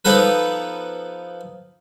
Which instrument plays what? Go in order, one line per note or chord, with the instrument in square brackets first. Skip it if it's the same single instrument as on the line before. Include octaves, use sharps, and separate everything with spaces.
[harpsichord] F3 B3 D#4 A4 B4